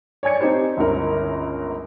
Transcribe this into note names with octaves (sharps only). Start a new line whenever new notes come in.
C#5 D5 G#5 G#6 C#7
C4 D4 D#4 G4 C5 C#5
G1 C#2 E4 A#4